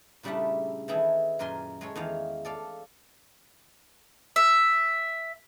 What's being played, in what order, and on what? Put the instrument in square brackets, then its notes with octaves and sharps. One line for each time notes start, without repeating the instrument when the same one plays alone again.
[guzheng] A#2 C#3 G3 A3 D4 E4
D#3 E3 E4 G#4 A4
F#2 A#2 A#4 G#5 C6
G#3 A4 C#5
E2 D#3 F5
A4 D5 F5
[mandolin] E5